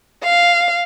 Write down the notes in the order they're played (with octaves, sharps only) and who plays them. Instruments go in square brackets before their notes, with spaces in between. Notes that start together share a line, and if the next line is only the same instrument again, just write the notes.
[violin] F5